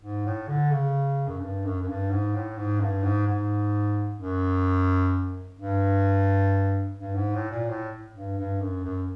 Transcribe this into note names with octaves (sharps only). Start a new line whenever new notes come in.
G#2
A2
D3
C#3
F#2
G2
F#2
F#2
G2
G#2
A2
G#2
G2
G#2
G#2
F#2
G2
G2
G#2
A2
A#2
A2
G2
G2
F#2
F#2